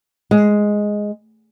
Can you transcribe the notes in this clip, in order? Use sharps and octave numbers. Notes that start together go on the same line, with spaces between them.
G#3